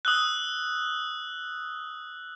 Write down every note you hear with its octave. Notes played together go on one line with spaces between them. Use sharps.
D#6 E6 F#6